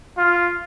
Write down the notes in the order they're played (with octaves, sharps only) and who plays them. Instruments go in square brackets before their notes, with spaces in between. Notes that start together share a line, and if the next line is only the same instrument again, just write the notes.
[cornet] F4